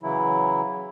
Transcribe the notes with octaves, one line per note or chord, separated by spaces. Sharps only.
C#3 E3 F#3 E4